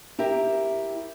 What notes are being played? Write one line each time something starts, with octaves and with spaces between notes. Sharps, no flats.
E4 G4 A#4 E5